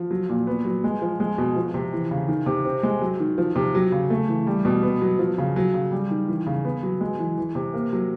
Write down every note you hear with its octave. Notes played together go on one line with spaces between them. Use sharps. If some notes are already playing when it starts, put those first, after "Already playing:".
Already playing: F3
F#3
A#2
B3
F#3
G#3
F3
G#3
B2
F3
C3
E3
C#3
D#3
C3
C4
G#3
F#3
D#3
F3
C3
F#3
C#3
A3
E3
G3
B2
B3
F#3
F3
C#3
F#3
C#3
G3
D#3
E3
C#3
B3
F#3
G#3
E3
E3
C3
A#3
F#3